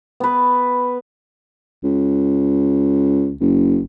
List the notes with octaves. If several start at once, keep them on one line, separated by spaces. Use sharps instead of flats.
B3 B4
C#2
F#1